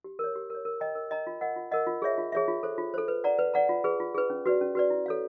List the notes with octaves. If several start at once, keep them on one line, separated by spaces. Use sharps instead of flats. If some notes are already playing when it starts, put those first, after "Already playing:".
G4
A#4 C#5
G4
A#4 C#5
A#4
D#5 G5 A#5
A#4
D#5 G5 A#5
F4
A#4 D#5 F#5
F4
A#4 D#5 F#5
F4
G#4 C#5 E5
F4
G#4 C#5 E5
F4
A4 C5
F4
A4 C5
B4
D5 F#5 A#5
B4
D5 F#5 A#5
F4
G#4 B4
F4
G#4 B4
C#4
F#4 B4 D5
C#4
F#4 B4 D5
E4
A4 C#5 F5